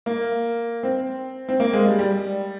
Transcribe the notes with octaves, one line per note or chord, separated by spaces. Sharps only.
A#3
C4
C4
A#3
G#3
G3
G3